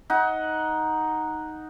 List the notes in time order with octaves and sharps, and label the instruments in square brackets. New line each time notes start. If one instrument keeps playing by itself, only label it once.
[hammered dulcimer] D#4 F#5